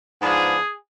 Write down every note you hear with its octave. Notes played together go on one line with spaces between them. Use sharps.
G#2 F3 B3 D4 G#4